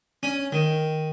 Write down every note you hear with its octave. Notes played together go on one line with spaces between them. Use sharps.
C#4
D#3